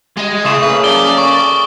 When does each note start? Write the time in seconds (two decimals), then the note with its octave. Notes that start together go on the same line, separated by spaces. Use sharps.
0.17 F#3 G#3 D#5
0.45 C#3 G#3 E4 G#4 D#6 E7
0.63 A#3 C#4 A4 B4
0.84 F2 D5 G7
1.18 C#6